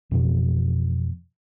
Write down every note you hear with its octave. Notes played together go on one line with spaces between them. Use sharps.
F2 B2 E3 F3